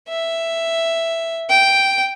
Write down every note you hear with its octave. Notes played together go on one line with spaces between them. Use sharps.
E5
G5